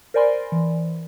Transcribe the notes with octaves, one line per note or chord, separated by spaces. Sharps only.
A#4 C5 D5 G#5 B5 C6
E3